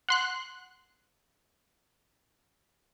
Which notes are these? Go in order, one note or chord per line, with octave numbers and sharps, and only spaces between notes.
F#5 C6 F#6